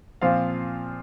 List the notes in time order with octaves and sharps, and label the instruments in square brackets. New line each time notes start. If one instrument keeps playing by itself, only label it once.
[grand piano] A#2 F3 C4 F4 F5